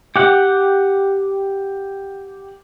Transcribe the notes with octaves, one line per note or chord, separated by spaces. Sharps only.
G4 F#5